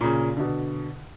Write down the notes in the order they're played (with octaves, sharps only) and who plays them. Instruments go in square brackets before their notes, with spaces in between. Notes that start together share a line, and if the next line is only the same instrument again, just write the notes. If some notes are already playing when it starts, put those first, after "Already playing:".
[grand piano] A#2 C#3
B2 D3